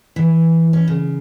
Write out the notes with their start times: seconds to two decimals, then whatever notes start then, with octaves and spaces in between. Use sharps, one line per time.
0.16 E3
0.73 C#4
0.88 C#3